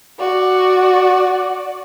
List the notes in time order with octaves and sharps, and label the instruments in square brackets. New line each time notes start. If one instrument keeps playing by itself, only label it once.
[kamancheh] F#4 D5